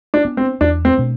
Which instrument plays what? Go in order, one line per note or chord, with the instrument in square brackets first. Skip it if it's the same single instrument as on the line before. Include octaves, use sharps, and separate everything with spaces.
[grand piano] D4
[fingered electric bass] B3 D4
[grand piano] C4
[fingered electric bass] E2 [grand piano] D4
[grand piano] C4
[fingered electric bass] B2 A3 D4